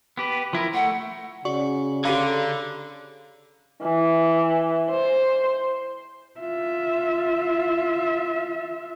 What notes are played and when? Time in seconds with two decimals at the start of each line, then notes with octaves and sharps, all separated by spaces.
0.18 B3 G4 B4
0.53 F3 E4 A#4
0.74 A3 F#5
1.45 C#3 F#4 D5 F#5 C#6
2.05 D3 G4 A4 F5 A#5 B5 D6
3.83 E3
4.90 C5
6.40 F4 E5